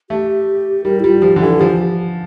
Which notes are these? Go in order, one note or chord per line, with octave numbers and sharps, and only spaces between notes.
A3 G4
G3 A#4
E4
G3 F4
F3 G4
D3
E3 A4
F3 G4